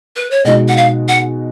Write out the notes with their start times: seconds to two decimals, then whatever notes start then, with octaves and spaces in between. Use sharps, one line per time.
0.16 B4
0.31 C#5
0.45 B2 G#3 D#4 F#4 D#5
0.68 F#5
0.77 F5
1.09 F#5